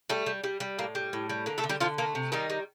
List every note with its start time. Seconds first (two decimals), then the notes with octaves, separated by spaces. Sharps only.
0.10 G3 A3
0.26 G3
0.44 G3
0.60 G3
0.79 A2 A#3
0.95 G3
1.13 A2
1.30 G3
1.46 D3 A#3
1.58 A3 A4
1.64 D3
1.69 G3 G4
1.80 D3 F3 F4
1.98 A3 A#3
2.15 C3
2.32 D#3 G3 D#4
2.50 G3